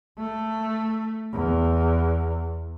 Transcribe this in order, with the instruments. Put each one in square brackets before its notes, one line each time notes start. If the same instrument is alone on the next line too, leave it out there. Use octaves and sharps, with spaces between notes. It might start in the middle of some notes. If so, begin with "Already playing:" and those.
[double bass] A3
E2